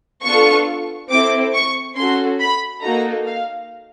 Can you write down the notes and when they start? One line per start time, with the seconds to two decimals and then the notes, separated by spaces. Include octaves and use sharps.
0.25 B3 D4 F4 A4 C#6
1.10 C4 E4 A4 D6
1.54 C#6
1.97 C#4 F#4 A4 C6
2.40 B5
2.81 A#3 D#4 F#4 A4 A#5
3.25 F5